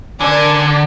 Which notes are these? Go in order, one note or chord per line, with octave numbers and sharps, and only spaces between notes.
D3 D4 A#4 G#5